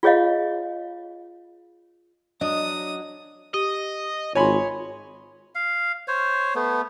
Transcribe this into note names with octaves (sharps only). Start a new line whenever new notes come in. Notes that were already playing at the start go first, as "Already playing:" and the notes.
F4 G#4 C#5 D#5 F5
F#3 D4 D#5 D#6
G4 D#5
G#1 F4 C#5 G#5 B5 C6
F5
C5 C#5
A3 B3